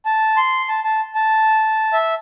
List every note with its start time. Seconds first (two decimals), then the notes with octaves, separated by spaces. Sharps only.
0.06 A5
0.37 C6
0.69 A5
0.84 A5
1.15 A5
1.93 E5